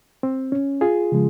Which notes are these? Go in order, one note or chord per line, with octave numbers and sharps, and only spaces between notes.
C4
C#4
F4 G#4
C#3 F3 G#3